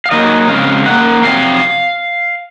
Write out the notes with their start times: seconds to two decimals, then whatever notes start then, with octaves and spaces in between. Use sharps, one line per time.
0.06 F5
0.11 D#3 F#3 A#3 D#5
0.49 C#3 G#3 C4 F5
0.86 D#3 A#3 F#5
1.23 C3 F#3 C4 F5